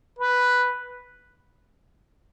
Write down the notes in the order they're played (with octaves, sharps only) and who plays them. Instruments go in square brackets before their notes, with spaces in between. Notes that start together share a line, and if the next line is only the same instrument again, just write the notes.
[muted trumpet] B4